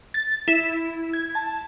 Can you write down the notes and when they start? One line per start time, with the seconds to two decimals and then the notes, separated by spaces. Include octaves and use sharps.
0.14 A6
0.48 E4
1.13 G#6
1.35 A5